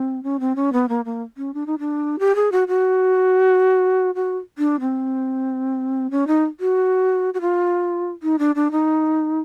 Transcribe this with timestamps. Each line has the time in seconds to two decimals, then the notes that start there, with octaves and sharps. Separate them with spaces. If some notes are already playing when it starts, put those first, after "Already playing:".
Already playing: C4
0.23 C#4
0.40 C4
0.56 C#4
0.73 B3
0.89 A#3
1.05 A#3
1.37 C#4
1.54 D4
1.67 D#4
1.79 D4
2.19 G4
2.35 G#4
2.52 F#4
2.68 F#4
4.15 F#4
4.58 D4
4.80 C4
6.11 C#4
6.27 D#4
6.60 F#4
7.34 F#4
7.41 F4
8.23 D#4
8.39 D4
8.55 D4
8.71 D#4